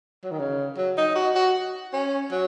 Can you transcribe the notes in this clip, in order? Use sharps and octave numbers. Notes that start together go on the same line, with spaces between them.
F#3
D#3
C#3
F#3
D#4
F#4
F#4
C#4
F#3